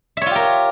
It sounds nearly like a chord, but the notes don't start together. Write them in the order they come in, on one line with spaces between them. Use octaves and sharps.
E5 C#5 F4 G4 A#4